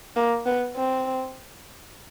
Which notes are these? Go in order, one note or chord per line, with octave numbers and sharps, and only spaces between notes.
A#3
B3
C4